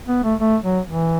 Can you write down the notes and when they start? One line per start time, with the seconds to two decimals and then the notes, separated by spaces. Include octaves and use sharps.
0.08 B3
0.24 A3
0.40 A3
0.63 F#3
0.88 E3